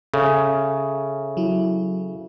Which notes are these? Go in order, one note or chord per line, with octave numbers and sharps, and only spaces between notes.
C#3 A4 E5
F#3 E4